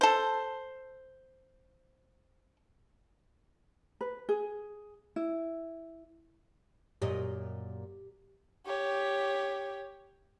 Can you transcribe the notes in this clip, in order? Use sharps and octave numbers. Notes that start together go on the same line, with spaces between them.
A4 C5
B4
G#4
E4
F#2 A#2 G4 D#5
G4 C#5